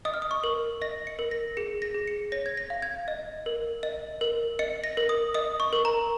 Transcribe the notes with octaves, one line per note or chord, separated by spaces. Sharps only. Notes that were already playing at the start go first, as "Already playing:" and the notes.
D#5 D#6
F6
D#6
C#6
A#4
D#5 A#6
C#7
A#4
A#6
G#4 C#7
A#6
G#4
C#7
C#5 A#6
G#6
A#6
F5
G#6
D#5
A#4
D#5
A#4
D#5 C#7
A#6
A#4
D#6
D#5 D#6
C#6
A#4
A#5